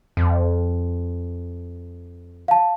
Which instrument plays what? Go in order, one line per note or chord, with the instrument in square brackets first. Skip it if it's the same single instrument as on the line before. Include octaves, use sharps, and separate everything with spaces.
[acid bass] F2
[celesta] F5 A5